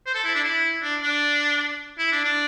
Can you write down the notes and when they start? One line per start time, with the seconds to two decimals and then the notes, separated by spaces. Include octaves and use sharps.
0.06 C5
0.14 A4
0.24 E4
0.35 D4
0.44 E4
0.82 D4
1.02 D4
1.98 E4
2.12 D4
2.24 D4